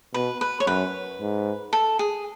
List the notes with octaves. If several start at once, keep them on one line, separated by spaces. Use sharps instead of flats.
B2 B4
B4
C#5
F#2 B4
G#2
A4
G#4